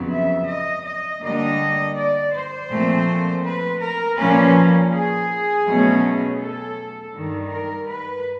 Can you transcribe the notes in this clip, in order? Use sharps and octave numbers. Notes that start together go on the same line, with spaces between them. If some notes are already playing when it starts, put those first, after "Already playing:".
Already playing: F2 C#3 F#3 B3
E5
D#5
D#5
D3 G3 A#3 D4 D#5
D5
C5
A#2 F3 A3 C4
B4
A#4
A#2 F3 A#3 C#4 B4
G#4
B2 F#3 A3 C#4
A4
G2 D#3 G3
A#4
B4